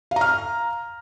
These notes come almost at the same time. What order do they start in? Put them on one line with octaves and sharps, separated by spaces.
F5 A#5 F6